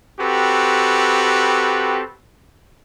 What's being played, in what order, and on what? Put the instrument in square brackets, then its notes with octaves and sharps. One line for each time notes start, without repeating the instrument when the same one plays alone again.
[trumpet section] C4 F#4 G4 A4 B4